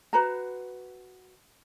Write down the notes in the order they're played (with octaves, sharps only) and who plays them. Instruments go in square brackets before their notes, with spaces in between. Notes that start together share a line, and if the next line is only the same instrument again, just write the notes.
[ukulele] F#4 B4 C5 A#5